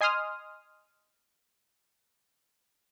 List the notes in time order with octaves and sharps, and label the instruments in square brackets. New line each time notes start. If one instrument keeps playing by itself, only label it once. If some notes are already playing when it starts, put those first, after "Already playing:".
[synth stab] D#5 G#5 C6 D#6 F6